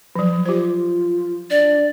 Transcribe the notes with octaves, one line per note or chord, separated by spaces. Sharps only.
F3 F#3
F4 G4 C5
D4 D5